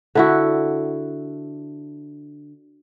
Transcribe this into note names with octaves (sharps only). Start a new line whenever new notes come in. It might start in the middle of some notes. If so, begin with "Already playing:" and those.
D3 E4 F#4